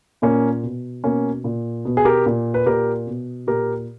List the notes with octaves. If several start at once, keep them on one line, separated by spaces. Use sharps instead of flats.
A#2 A#3 C#4
B2
B2 A#3 C#4
A#2
B2
G#4
G4 A#4
A#2
B4
A#2 G4 A#4
B2
A#2 G4 A#4